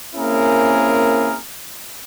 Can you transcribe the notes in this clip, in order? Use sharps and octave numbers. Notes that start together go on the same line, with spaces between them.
A#3 C4 C#4 E4 G#4 A#4